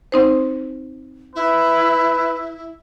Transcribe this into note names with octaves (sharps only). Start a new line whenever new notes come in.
C4 D#4 C5
E4 B4